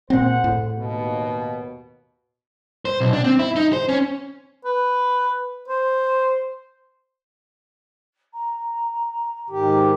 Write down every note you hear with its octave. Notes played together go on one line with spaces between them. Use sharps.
A#2 C4 G#4 C5 F#5
A2
D#2 B2
C5
B1
D4
C4
E4
D#4
C5
C#4
B4
C5
A#5
G#2 D#3 G4